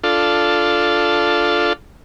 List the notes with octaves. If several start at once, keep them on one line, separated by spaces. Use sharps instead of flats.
D4 F4 A4